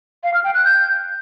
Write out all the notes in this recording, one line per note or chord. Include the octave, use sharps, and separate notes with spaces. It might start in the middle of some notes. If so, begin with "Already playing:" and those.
F5
F6
G5
F#6
G6